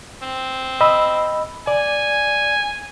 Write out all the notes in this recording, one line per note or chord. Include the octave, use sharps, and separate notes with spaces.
C4
D#5 B5 E6
D5 G#5